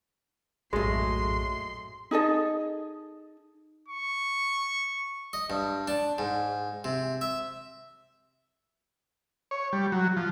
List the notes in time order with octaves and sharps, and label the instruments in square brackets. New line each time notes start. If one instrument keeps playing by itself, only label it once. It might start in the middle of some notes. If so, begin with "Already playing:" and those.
[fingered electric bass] A#1 F#2 A2 [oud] F#3 A3 [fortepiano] G#3 [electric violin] C6
[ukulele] D#4 G#4 A4 D#5
[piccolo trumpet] C#6
[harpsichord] D#5
G2
D4
G#2
C3
E5
[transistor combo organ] C#5
G3
F#3
F3